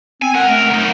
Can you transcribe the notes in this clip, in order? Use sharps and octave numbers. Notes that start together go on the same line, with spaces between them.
C4 G#5
C#2 A#4 F#5
A3
F#3 D#4